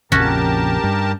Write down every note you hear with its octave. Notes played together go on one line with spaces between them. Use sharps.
A#1 F2 C#3 C#4 F#4 G4 A#4 A5
G2